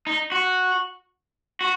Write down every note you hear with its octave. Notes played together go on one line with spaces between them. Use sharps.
D#4
F#4
F#4